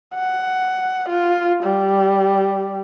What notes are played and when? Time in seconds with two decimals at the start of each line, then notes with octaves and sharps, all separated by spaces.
0.15 F#5
1.09 F4
1.63 G3